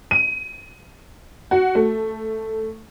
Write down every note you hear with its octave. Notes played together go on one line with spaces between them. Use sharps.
D#7
F#4
A3